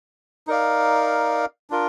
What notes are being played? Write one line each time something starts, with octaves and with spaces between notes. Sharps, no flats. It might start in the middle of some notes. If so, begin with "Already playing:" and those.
D#4 A#4 D5 F5
D4 F4 A#4